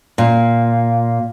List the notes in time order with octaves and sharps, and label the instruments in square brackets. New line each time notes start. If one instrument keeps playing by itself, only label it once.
[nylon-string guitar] A#2